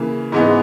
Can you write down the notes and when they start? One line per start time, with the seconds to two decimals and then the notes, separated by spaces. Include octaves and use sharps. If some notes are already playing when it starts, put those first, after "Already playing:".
Already playing: C#3 E3 A#3
0.32 G#2 E3 G#3 B3